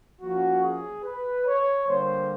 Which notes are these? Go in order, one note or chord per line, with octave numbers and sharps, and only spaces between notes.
F3 A#3 C#4 F#4
G#4
B4
C#5
D3 G3 A#3 C5